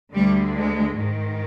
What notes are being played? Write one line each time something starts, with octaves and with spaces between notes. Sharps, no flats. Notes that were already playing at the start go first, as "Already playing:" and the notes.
D2 D3 G3
G#3
G#2 D#3